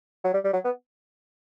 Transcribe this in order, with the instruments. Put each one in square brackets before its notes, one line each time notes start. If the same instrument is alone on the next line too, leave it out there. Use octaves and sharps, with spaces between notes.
[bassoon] F#3
G3
G3
F#3
B3